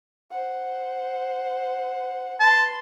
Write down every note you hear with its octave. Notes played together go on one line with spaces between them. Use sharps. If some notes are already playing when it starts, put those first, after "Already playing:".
C5 F#5
B4 A5 C6